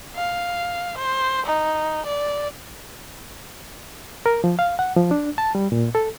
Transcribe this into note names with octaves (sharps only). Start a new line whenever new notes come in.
F5
C5
D#4
D5
A#4
F3
F5
F#5
F3
D4
A5
G3
A#2
A4